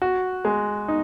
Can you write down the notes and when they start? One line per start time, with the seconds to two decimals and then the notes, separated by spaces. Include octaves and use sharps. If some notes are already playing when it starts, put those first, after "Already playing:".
0.02 F#4
0.45 G#3
0.88 D#4